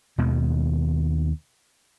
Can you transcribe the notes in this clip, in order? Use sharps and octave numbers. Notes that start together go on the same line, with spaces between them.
D#2 B2 D#3 G#3